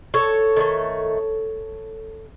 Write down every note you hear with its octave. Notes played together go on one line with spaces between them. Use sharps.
A4 C#5
D#3 F#3 A3